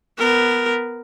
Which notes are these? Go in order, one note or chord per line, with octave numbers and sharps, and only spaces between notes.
B3 A#4